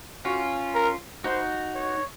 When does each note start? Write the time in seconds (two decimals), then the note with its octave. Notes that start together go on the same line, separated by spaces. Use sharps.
0.25 C#4 F4 F#4
0.75 A#4
1.24 D#4 F#4 C5
1.75 C#5